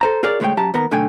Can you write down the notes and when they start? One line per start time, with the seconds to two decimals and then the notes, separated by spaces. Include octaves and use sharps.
0.01 A4 C5 A#5
0.23 F4 G#4 A#4 C#5 D5
0.40 D2 G#3 A3 B4 C#5 G5
0.57 F#2 G4 A5 A#5
0.74 D#2 B3 A#4 A#5
0.91 B1 D3 A3 G5 G#5